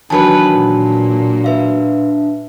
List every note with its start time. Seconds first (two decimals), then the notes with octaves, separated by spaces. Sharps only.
0.10 E2 D#3 F#3 B3 D4 B4 G#5 A5
0.52 A#2
1.44 B4 E5 F5